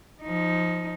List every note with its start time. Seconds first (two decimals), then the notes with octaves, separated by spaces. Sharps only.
0.23 F3 D#4